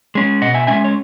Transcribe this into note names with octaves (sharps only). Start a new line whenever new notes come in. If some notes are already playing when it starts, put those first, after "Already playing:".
G#3 C#4
B2 D#5 F#5
E5 G#5
G#3 C#4 E5 G#5
C#5